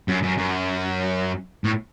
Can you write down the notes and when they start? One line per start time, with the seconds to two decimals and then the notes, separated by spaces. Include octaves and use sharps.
0.08 F#2
0.23 F#2
0.38 F#2
1.64 A2